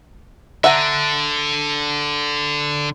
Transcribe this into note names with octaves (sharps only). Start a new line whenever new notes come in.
D3 E5 F#5 A#5